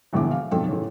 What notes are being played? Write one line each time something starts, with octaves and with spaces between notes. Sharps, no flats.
E1 A#1 E2 D3 E5 D6
F5
B1 F2 A4 G5
A1 C#3